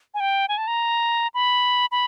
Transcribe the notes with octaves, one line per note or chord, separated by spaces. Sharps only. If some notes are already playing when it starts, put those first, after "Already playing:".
G#5
G5
G#5
A5
A#5
B5
B5